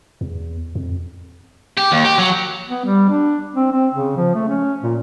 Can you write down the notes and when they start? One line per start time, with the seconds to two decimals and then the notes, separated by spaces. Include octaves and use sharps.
0.21 E2
0.75 F2
1.77 G4
1.92 D#2
2.04 G4
2.18 F#3
2.69 B3
2.85 G3
3.09 D4
3.55 C4
3.72 C4
3.94 C#3
4.17 F3
4.35 A3
4.48 C#4
4.82 A#2